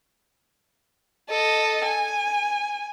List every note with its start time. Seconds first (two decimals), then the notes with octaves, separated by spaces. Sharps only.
1.29 A4 D#5
1.85 G#5